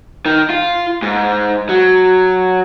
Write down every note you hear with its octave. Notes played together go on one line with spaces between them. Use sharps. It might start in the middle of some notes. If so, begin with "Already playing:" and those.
D#3
F4
G#2
F#3